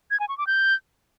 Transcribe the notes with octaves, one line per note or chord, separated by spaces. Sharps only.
G#6
G#5
C#6
D6
G6